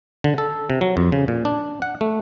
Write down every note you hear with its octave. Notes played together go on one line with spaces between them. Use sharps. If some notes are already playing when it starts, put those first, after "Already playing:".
D3
A4
C3
F#3
F2
C#3
A#2
D4
F#5
A3